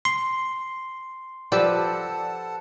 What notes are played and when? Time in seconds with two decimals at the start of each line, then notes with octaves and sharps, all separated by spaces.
0.05 C6
1.52 F3 G4 A4 B4 D5 F#5 A5 E6